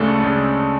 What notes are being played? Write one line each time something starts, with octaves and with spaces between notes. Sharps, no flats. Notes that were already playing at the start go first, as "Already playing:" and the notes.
Already playing: D2 C#3 G#3 A3 D4 A4
D2 C#3 G#3 D4